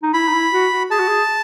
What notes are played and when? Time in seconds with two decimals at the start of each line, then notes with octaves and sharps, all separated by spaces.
0.03 D#4
0.14 E4 B5
0.28 D#4
0.33 E4
0.52 F#4
0.72 F#4
0.91 G#4 A5
0.99 F#4
1.08 G#4